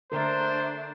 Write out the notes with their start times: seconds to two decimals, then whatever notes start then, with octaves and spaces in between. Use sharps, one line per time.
0.12 D3 A3 D4 A#4 C5